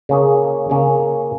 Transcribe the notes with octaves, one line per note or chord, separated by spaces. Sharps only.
C#3 A#3 C#4 G#4
C#3 A#3 C#4 G#4